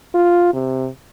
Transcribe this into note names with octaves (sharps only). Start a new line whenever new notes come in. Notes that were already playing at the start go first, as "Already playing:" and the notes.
F4
C3